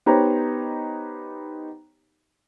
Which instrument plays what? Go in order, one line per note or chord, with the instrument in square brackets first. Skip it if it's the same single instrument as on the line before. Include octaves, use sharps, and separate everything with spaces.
[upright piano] B3 D#4 G4 C5 C#5 A#5